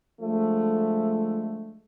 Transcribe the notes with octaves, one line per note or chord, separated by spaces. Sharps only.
D3 F3 G#3 A3